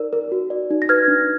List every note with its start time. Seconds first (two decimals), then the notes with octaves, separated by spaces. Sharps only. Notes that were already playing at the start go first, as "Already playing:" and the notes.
Already playing: D#4 A#4 D5
0.13 A#4
0.32 F#4
0.50 D5
0.70 D#4
0.82 A#6
0.89 B4 F6 G#6
1.08 D4